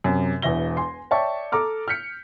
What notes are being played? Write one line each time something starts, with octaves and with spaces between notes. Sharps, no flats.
F#2 C3
E1 E2 E5 A#6 G7
G#5 C6
C#5 D5 E5 G5 A5 C#6
A4 A#5 D6 F6
F6 G6 B6 C#7